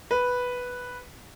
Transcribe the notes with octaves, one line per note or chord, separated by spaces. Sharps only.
B4